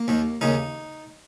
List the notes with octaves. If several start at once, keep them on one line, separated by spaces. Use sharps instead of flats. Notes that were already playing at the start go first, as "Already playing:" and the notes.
Already playing: A#3
D#2 D#3
D#2 C#3 D#4